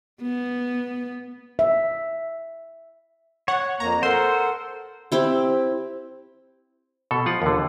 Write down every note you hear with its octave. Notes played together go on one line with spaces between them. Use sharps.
B3
E5
C#5 F#5
F2 A#3 A#5
A4 A#4 C5 F#5 C6
C4 E4 G4
B2 A4
F3 F4 F#5
D#2 D3